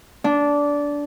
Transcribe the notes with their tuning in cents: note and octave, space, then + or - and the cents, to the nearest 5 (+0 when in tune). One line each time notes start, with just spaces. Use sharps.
D4 -15